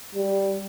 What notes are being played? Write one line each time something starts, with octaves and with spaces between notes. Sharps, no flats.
G3